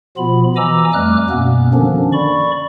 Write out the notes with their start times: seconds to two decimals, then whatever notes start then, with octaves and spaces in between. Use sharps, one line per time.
0.17 B2 F3 B3 F4 B5
0.56 E3 D#5 G#5 A#5 D6 E6
0.94 F2 G3 A3 D6 F6 F#6
1.30 F#2 B2 A#3 B3 C#4
1.74 D3 D#3 F3 C#4 D4
2.13 D5 B5 C#6